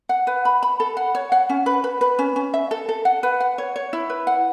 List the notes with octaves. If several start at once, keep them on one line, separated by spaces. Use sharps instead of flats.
F#5
B4
B5
B5
A4
F#5
C#5
F#5
C#4
B4
B4
B4
C#4
C#4
E5
A4
A4
F#5
B4
F#5
C#5
C#5
E4
B4
F#5